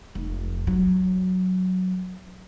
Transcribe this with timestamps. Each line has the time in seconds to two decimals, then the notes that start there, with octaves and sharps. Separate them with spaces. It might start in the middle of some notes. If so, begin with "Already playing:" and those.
0.15 F1
0.67 F#3